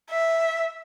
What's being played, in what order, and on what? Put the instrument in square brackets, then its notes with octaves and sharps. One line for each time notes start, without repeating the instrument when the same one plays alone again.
[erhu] E5